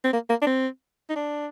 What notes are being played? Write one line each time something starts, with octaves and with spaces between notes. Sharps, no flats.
C4
A#3
A#3
D4
C4
D#4
D4